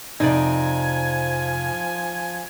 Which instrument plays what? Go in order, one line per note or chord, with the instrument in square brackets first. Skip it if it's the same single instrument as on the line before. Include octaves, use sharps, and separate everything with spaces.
[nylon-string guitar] F2 C3 D5 [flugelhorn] F3 [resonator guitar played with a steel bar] D#4 [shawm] G#5